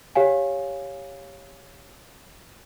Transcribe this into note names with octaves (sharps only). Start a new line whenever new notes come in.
G4 C#5 F5 G#5